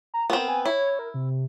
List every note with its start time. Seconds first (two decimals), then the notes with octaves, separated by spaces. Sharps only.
0.14 A#5
0.30 B3 C4 A#4
0.48 G#5
0.66 E4 C#5
0.99 A#4
1.14 C3